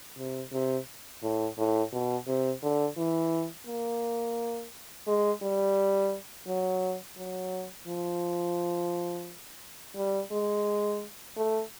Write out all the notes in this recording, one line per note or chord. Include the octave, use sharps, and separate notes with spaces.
C3
C3
A2
A2
B2
C3
D3
E3
A#3
G#3
G3
F#3
F#3
F3
G3
G#3
A3